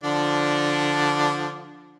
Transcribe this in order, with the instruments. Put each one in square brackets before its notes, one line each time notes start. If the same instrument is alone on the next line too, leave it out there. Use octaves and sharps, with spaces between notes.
[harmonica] D3 F3 D4